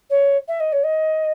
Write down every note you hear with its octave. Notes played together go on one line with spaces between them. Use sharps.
C#5
E5
D#5
C#5
D#5